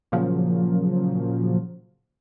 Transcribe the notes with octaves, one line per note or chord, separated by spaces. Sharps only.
A#2 C#3 F3 F#3 A#3